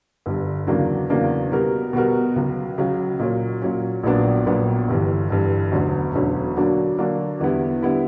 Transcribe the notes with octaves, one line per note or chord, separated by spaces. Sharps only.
G1 G2 D3 G3
E2 C#3 F#3 A#3 D4
E2 C#3 F#3 A#3 D4
B2 G3 B3 F#4 A#4
B2 G3 B3 F#4 A#4
C#2 C#3 F#3
C#2 C#3 F#3
A#2 F#3 C#4
A#2 F#3 C#4
A#1 A#2 F#3 B3 D4
A#1 A#2 F#3 B3 D4
G1 G2 E3
G1 G2 E3
E1 D2 D3 F#3 C#4
E1 D2 D3 F#3 C#4
D3 F#3 A#3 D4 F#4
D3 F#3 A#3 D4 F#4
E2 D3 G3 B3 E4
D3 G3 B3 E4